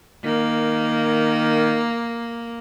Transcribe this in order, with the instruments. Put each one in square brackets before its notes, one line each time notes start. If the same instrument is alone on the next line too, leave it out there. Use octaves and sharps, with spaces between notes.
[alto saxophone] D#3 [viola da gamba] A#3